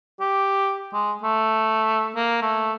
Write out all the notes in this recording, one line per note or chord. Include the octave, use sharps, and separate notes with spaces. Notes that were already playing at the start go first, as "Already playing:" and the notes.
G4
G#3
A3
A#3
A3